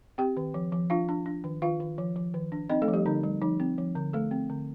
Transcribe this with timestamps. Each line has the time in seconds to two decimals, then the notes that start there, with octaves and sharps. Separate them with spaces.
0.18 C4 G4 G5
0.37 D#3
0.54 F3
0.72 F3
0.90 D4 F4 F5
1.09 D4
1.26 D4
1.44 D#3
1.62 D#3 F4 F5
1.80 D#3
1.98 F3
2.16 F3
2.34 D#3
2.52 D4
2.69 C4 D#4 D#5
2.82 A3 A4
2.88 F3
2.93 G3 G4
3.06 D3 D#4
3.24 G3
3.42 F3 D#4
3.60 C4
3.78 F3
3.95 D3
4.13 A3 A4
4.31 C4
4.50 D3